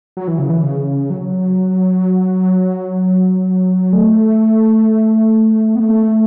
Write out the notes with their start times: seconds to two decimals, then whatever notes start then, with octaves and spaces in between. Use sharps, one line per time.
0.17 F#3
0.28 E3
0.39 C#3
0.50 E3
0.63 C#3
1.10 F#3
3.93 A3
5.76 B3
5.80 A3